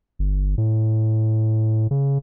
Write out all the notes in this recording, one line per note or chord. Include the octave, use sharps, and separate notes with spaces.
G1
A2
C#3